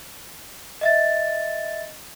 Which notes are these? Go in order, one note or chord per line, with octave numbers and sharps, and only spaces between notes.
D#5 E5 A6